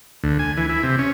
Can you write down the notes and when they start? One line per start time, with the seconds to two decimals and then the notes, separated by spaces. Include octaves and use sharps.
0.24 D2
0.39 G#5
0.57 E3
0.69 E4
0.83 C3
0.98 C#4